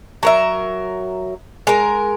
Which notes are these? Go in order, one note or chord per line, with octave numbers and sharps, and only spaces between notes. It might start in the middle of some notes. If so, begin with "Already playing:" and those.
F#3 A#4 E5
G#3 A#4